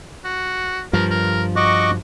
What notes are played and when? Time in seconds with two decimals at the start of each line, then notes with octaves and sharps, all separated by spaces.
0.24 F#4
0.93 G2 F3 A#4
1.10 A#4
1.56 F#4 D#5 C#6 D6